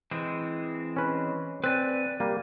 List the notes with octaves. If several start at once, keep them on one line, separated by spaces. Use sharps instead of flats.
E3 G#3 C4
C#4 B4
C4 B4 D5 G#5
G3 A#3